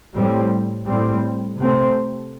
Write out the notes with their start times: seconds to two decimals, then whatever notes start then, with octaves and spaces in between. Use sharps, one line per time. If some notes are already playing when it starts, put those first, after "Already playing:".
0.13 A2 G3 C4
0.86 A2 G3 C4
1.57 C3 A3 C4